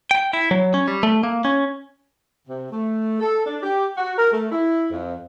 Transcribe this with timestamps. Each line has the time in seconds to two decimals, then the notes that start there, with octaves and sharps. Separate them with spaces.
0.11 G5
0.33 E4
0.51 F#3
0.74 C#4
0.88 G3
1.03 A3
1.23 A#3
1.45 C#4
2.48 C3
2.72 A3
3.21 A4
3.45 D4
3.63 G4
3.97 F#4
4.18 A#4
4.32 A3
4.51 E4
4.91 F2